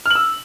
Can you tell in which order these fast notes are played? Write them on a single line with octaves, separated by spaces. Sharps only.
F6 F#7 E6